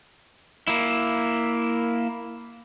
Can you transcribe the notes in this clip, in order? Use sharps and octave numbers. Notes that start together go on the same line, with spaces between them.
A#3 E4